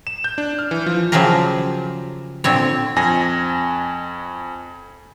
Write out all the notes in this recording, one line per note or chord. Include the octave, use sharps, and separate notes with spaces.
E7
G6
D4
F6
E3
F3
C#3 F3 F#3 G4 G#4 A#4
A#2 D3 C4 C#5
F2 G#5 A#6